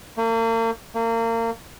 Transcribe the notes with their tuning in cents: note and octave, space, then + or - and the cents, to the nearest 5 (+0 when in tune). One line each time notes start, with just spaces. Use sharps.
A#3 -40
A#3 -30